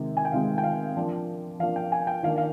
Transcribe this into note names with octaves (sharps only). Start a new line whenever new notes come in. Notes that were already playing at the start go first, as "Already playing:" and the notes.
Already playing: C3 D#3 G#3 C4
G#5
G5
C3 D#3 G#3 C4 F5
G5
F5
F3 A#3 D4
F3 A#3 D4 F5
G5
G#5
G5
D#3 A#3 D4 F5
F5